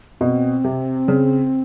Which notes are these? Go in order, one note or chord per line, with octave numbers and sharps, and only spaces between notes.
B2 C4
C3
C#3